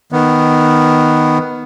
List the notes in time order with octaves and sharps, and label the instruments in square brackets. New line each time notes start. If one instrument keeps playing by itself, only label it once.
[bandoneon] D#3 B3